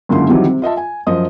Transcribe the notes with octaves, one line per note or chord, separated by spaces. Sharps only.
C#2 F#2 D3 A#3 E4 C6
C3 D#3 E3 F#3 G3
C3
F4 D#5 E5 A5
G#5
F#2 F3 D#5 D#6